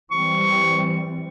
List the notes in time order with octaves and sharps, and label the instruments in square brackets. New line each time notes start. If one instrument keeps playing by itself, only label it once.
[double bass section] E3 G3 C4 [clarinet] C#6